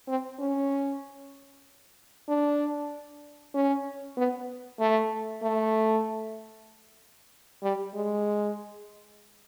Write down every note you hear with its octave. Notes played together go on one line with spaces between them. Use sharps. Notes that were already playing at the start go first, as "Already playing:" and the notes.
C4
C#4
D4
C#4
B3
A3
A3
G3
G#3